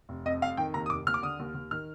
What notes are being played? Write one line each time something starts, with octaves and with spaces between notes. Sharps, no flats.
F1
F2 D#5
F2 F5
D#3 G5
D#2 A#5
D#6
F1 D6
D#2 F6
D6
D3 D#6
D#2
D#2
D#3 F6